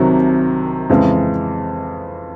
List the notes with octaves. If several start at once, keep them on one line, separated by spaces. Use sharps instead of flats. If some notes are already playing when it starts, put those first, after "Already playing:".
Already playing: C2 C3 D#3 F#3
F2 C#3 E3 G#3